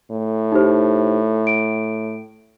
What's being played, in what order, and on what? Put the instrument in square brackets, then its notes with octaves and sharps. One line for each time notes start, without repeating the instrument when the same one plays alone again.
[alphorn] A2
[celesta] D#4 G4 C5
D7